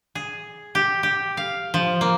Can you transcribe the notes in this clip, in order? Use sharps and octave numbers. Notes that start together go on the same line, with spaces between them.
G#4
G4
G4
F5
F3
A#3